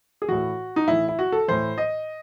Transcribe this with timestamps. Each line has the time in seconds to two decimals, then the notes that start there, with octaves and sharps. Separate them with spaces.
0.22 G#4
0.28 A2 E3 F#4
0.76 D#4
0.88 A2 E3 E4
1.08 E4
1.19 F#4
1.32 A4
1.48 A2 E3 C5
1.78 D#5